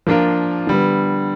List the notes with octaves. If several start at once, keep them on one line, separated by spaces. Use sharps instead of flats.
F3 A#3 D4 F4 A#4
D3 G3 B3